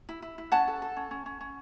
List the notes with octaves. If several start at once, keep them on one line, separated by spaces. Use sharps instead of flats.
E4
E4
E4
C#4 F#5 A5
A4
A4
C#4
C#4
C#4
C#4